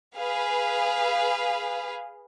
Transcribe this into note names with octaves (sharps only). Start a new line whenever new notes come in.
G#4 B4 F5